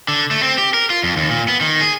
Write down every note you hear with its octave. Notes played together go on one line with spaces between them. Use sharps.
D3
A3
C4
G4
A#4
F4
F2
D#2
A#2
B3
D#3
G#4